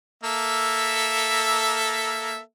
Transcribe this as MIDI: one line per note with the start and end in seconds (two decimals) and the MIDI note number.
0.23 2.39 58
0.23 2.39 69
0.23 2.39 76